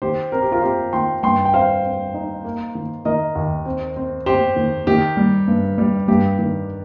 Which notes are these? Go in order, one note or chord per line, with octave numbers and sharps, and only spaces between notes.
D#3 G4 C5
C4 A#4
G4
F4 A#4
C4 G4 C5
D#3 G5 C6
G2 G5 C6
G5
C4 C5 F5
C4
D#4
A#3
D#3
D#3 A#4 D#5
D#2
C4
C4
C4 G4 C5
D#3
D#3 G4
G3
G2
G3
G2 G4
D#3